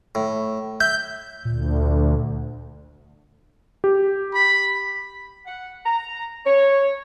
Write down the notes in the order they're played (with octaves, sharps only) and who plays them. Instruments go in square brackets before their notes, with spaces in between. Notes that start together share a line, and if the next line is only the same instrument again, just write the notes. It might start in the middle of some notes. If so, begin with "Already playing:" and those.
[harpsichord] A2
[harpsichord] E5 [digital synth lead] G6
[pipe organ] D2 [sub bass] A#2
[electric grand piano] G4
[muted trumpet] B5
[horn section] F#5
A#5
C#5